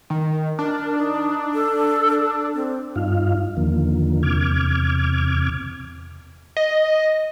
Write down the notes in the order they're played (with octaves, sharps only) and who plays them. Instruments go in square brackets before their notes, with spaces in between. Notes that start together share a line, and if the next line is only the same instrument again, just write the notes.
[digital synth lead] D#3
[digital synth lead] D4 [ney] A#4
[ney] D#4
A4
C4
[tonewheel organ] G2 D#4 F4 F5
E2 D3 D#3 F3 A#3
E2 C3 D6 F6 G#6
[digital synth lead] D#5